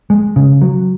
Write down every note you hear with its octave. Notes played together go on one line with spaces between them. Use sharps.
G#3
C#3
F#3